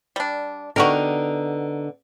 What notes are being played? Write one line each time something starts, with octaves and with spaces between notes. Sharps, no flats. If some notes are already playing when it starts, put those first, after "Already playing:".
G3 D4
D3 B3 D#4 F#4 G4 A#4